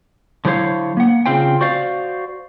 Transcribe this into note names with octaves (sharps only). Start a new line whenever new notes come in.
D3 F#3 E4 C5 C#5 F5
A#3 F#5
C#3 A#3 C4 F4 C5 G5
F#4 C5 D5 F5